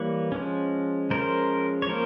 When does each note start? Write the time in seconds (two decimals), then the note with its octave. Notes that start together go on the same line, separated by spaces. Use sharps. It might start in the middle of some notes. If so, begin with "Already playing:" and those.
Already playing: E3 G3 A#3 B4 C#5
0.32 F3 G#3 C#4
1.10 F3 G#3 C#4 A#4 C5
1.82 C#5
1.89 F3 A#3 C#4 A#4 C5